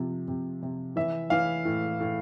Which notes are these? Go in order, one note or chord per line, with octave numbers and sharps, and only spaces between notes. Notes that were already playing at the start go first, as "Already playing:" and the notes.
Already playing: C3 F3
C3
C3
E3 E5
E3 F5
A2
A2